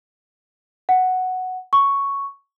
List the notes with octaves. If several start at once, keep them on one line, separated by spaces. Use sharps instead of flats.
F#5
C#6